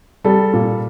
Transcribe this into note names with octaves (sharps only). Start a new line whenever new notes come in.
G3 A4
A#2